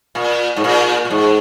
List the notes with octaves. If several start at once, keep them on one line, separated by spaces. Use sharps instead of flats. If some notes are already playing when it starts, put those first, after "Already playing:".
A#2
G#2
A#2
A#2
G#2